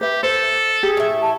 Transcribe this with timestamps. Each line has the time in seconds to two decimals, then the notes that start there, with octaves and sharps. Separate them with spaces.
0.01 G4 B4 E5
0.23 A4 C5
0.83 G4 G#4
0.97 A2 E5
1.22 A5